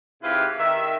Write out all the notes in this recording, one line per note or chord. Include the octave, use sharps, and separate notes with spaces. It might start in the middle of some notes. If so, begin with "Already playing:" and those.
G#2 C3 E4 F4 G4 B4
D#3 E5